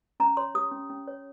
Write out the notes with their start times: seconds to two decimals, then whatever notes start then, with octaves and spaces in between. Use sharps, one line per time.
0.20 C#4 A#5
0.37 C#5 C6
0.55 G4 D#6
0.72 C#4
0.90 C#4
1.08 C#5